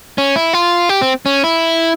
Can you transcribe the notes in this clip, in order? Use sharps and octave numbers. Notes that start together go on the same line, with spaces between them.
C#4
E4
F4
G4
C4
C#4
E4